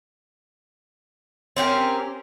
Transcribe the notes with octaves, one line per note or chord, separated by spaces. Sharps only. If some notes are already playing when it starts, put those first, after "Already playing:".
C4 C#4 G4 A#4